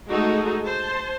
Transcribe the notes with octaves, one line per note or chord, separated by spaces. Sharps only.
G#3 A3 D#4 F#4 G#4 A4
C5 A5